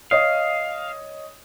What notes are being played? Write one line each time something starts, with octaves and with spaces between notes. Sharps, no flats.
C#5 D#5 F5 D#6